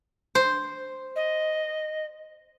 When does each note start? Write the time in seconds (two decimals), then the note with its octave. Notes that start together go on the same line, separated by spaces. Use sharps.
0.35 C5
1.16 D#5